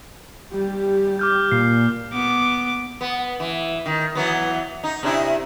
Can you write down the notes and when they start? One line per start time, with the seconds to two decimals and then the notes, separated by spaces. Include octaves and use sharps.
0.53 G3 G4
1.19 D6 F6 G6
1.52 A#2 C7
2.12 B3 D6
3.01 B3
3.40 E3
3.86 D#3
4.15 E3 F#3 B3
4.83 D#4
5.03 C3 D4 E4